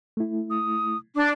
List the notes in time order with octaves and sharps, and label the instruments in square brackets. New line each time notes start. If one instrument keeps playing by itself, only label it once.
[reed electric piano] A3 E4
[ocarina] D#6
[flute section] D4 [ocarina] D6